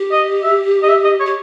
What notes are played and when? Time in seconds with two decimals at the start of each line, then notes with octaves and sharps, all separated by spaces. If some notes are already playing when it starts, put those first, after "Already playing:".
Already playing: G4
0.12 D#5
0.43 E5
0.83 D#5
0.89 E5
1.04 D#5
1.20 C#5
1.26 G4